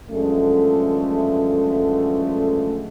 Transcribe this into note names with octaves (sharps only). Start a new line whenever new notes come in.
F#2 D3 E3 F3 G#3 A3